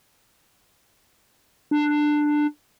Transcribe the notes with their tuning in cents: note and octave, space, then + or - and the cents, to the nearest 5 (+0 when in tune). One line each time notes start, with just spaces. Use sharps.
D4 +15